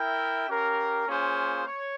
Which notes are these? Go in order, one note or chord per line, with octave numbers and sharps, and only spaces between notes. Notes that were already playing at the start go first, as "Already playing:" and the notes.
Already playing: E4 A#4 E5 G5
C#4 G4 A#4 F5
A#3 C#4 F4 G#4 C5
C#5